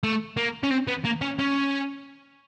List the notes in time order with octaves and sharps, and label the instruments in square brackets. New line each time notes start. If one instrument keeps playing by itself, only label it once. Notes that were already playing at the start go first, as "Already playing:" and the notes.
[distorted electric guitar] A3
A#3
C#4
C4
B3
A#3
C#4
C#4